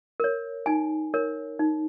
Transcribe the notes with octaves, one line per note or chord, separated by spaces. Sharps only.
A#4 C#5
D#4 G#5
A#4 C#5
D#4